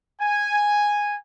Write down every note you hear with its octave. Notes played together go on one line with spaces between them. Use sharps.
G#5